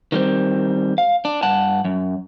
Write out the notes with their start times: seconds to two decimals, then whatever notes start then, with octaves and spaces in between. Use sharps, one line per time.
0.12 D#3 G3 C4
0.98 F5
1.25 D4
1.43 G2 F#5 A5
1.85 F#2